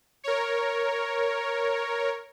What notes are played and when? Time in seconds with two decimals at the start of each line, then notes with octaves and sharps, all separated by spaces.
0.24 A#4 C#5